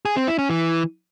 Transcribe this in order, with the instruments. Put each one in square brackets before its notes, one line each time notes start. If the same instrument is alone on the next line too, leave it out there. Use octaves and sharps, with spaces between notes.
[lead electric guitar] G#4
C4
E4
C#4
E3